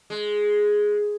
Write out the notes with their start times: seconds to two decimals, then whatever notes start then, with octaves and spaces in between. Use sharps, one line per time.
0.10 G#3